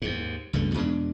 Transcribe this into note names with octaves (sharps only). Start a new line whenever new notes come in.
D#2 G#2
C#2 G2 B2 A3
E2 B2 G#3 D4